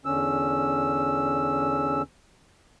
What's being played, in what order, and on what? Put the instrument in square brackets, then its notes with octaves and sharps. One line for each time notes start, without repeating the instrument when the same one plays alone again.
[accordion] E2 D3 C#4 E6